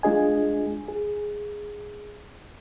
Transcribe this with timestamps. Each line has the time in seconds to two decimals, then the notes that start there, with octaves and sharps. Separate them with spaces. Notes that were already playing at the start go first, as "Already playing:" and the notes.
0.03 G#3 D4 F4 G#4 D#5 G#5
0.88 G#4